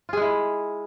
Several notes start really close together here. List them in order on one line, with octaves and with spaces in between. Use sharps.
F4 G#4 G#3 E4